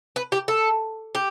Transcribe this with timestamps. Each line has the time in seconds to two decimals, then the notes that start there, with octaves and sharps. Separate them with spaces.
0.16 B4
0.32 G4
0.48 A4
1.15 G4